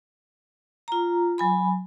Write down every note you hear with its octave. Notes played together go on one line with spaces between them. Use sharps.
F4 A#5
F#3 G#5 B5